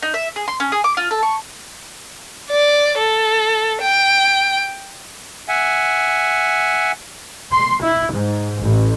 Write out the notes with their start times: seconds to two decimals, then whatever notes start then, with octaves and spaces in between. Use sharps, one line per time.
0.02 D#4
0.14 E5
0.36 G#4
0.48 C6
0.60 C#4
0.72 G#4
0.84 D6
0.97 F4
1.11 A4
1.23 C#6
2.51 D5
2.99 A4
3.81 G5
5.49 E5 F#5 G#5
7.52 C6
7.83 E4
8.13 G#2
8.63 A1